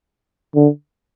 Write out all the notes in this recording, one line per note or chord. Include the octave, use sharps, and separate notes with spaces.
D3